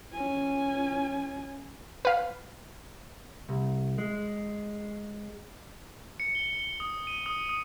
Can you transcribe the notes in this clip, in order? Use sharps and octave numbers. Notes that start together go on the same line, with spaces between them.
C#4 G#5
B4 F5
C2
G#3
C#7
G7
G7
D#6
D#7
D#6
D#6